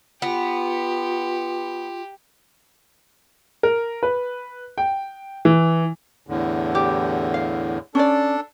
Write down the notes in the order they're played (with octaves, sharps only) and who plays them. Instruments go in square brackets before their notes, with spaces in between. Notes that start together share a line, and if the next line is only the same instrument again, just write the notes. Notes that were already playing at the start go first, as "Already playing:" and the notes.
[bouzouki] B3 [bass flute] F4 [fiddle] G4
[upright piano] A#4
B4
G5
E3
[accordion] E2 A2 D3
[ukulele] G4
F5
[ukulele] C#4 D5 [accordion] D4 A4